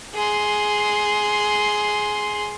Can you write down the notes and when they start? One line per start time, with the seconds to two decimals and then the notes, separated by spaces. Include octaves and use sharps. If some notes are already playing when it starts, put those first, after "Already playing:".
0.14 G#4 C6